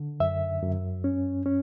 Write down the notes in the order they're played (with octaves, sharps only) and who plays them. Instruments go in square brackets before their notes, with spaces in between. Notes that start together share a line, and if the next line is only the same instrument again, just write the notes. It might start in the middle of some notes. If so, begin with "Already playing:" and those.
Already playing: [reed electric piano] D3
F#2 E5
F#2
C#4
C#4